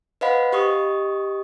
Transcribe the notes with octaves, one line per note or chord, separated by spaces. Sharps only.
B4 C5 D#5 F5 F#5 B5
G4 D#5 C#6 D#6